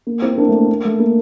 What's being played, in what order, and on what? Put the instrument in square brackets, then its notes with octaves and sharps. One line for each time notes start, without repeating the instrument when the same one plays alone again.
[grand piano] A#3
C4 E4
A#3 D4
A3
A#3
A#3
A3
A#3